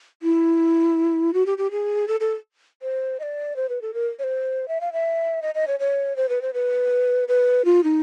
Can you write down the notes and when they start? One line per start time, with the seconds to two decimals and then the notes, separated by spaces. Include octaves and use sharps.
0.22 E4
1.33 F#4
1.46 G4
1.58 G4
1.71 G#4
2.08 A4
2.20 A4
2.82 C5
3.19 D#5
3.23 D5
3.56 C5
3.69 B4
3.82 A4
3.94 A#4
4.19 C#5
4.23 C5
4.68 E5
4.81 F5
4.92 E5
5.42 D#5
5.55 D#5
5.67 C#5
5.79 C#5
6.16 C5
6.29 B4
6.42 C5
6.53 B4
7.28 B4
7.65 F4
7.83 D#4